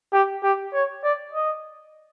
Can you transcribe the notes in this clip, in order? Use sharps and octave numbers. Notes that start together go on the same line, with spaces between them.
G4
G4
C#5
D5
D#5